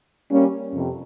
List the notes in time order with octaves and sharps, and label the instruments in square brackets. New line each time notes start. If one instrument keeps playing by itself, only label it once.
[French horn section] G3 A#3 C#4
F2 C3